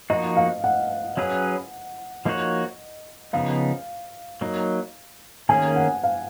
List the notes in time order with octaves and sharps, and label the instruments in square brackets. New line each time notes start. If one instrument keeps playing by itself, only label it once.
[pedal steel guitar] F3 A#3 D#4 F#4 [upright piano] D#5
[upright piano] F5
F#5
[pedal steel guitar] F#3 C#4 G#4 B4
[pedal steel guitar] F3 A#3 D#4 F#4 C#5 [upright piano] D#5
[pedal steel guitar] C#3 F3 B3 D#4 [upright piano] F5
[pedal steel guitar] F#3 A#3 D#4
[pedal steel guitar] D#3 A#3 C#4 G#4 [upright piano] G#5
[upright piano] F#5
F5